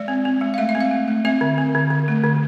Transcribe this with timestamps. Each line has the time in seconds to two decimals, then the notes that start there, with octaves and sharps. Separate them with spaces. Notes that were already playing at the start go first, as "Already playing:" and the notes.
Already playing: G#3 D5
0.08 C4
0.25 C4
0.41 G#3
0.54 F5
0.58 A3 E5
0.69 E5
0.75 C4
0.80 F5
0.91 A3
1.08 A3
1.25 C4 E5
1.41 D3
1.58 C4
1.75 D3
1.90 D3
2.08 A3
2.24 D3